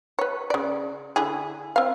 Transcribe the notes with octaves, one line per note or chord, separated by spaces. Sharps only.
B4 C#5
C#3 D5
D3 E4 G#4
C4 F5